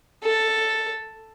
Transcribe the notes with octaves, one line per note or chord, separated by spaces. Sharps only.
A4